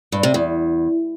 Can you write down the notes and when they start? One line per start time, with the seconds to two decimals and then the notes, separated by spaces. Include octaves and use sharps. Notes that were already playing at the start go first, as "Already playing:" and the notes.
0.12 G2
0.23 C3
0.34 E2